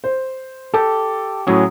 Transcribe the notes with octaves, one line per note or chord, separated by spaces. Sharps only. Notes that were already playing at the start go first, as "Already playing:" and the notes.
C5
G4 A4
A2 F#3 C#4 F#4 G#4